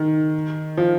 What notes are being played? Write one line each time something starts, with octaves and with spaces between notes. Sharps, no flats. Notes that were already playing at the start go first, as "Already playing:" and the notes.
Already playing: D#3
F3